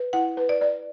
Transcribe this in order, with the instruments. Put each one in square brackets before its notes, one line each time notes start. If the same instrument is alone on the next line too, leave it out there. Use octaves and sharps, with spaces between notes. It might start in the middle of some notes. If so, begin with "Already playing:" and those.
Already playing: [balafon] B4
[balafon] E4 [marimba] F#5
[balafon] B4
[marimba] D5
[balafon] D5